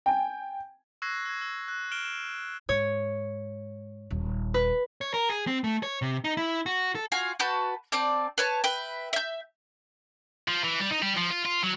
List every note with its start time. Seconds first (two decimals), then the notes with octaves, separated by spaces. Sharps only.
0.06 G5 G#5
1.02 C#6 E6 F#6 G#6 A#6 C7
1.25 E6 G#6
1.41 E6
1.68 F#6
1.92 F6 D7 E7 F#7 G7
2.05 E7
2.69 G#2 C#5
4.10 D#1 D#2
4.54 B4
5.01 C#5
5.14 A#4
5.29 G#4
5.47 C4
5.64 A3
5.83 C#5
6.02 C3
6.24 D#4
6.37 E4
6.66 F#4
6.95 A4
7.12 F4 F#4 F5 G#5
7.40 F#4 B4 A5 G6
7.92 C4 D5 A5 G6
8.38 B4 C#5 A5
8.64 B4 E5 G5
9.13 E5 G6
10.48 F3
10.64 E3
10.80 G3
10.91 D#4
11.02 G3
11.17 F3
11.30 F4
11.45 F4
11.63 F#3